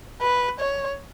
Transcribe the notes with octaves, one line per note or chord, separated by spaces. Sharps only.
B4
C#5